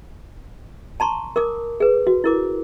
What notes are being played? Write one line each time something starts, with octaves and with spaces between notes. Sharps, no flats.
A5 A#5 C6 C#6
A#4 D6 D#6
G#4 B4
F#4
E4 A#4 D6